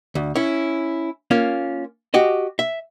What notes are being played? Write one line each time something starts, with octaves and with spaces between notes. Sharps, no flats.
D2
C#4 E4
A#3 C#4 F4
F#4 G4 D#5
E5